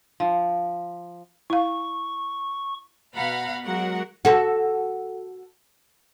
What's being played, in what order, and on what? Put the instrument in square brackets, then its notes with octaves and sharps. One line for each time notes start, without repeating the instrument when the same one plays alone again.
[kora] F3
[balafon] E4 F5 [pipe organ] C#6
[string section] B2 F5 F#5 A#5 B5
F#3 G#3 F#4 A#4 F#5
[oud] F#4 A4